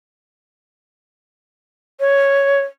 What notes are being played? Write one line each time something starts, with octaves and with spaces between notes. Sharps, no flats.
C#5